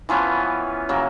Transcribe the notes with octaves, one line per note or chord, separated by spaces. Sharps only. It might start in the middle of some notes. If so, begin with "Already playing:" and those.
E3 F3 B3 C#4
C#3 F#3 A#3 E5